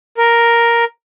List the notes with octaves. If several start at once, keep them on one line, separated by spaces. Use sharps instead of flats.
A#4